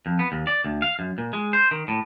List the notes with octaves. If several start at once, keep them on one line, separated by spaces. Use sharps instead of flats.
F2
B3
D#2
D5
D2
F5
F#2
A#2
G#3
C5
D#3
A2